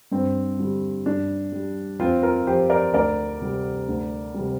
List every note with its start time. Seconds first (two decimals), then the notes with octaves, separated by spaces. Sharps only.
0.12 G2 C4
0.59 D3 G3
1.06 G2 D4
1.52 G3
1.99 F2 C4 F4
2.23 F4 A#4
2.47 F3 G4 C5
2.70 A#4 D5
2.94 D2 A#4 D5
3.41 C3 G3
3.88 D2
4.34 G3
4.40 C3